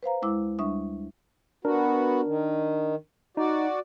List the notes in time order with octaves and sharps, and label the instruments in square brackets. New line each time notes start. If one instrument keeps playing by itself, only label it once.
[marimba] B4 C5 F5 A#5
D2 G#3 E4 D6 E6
D2 G3 D4 E5 C#6 D#6
[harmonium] B3 F#4 [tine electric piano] D4 A#4
[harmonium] D#3
[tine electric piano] D#4 [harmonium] F#4 D5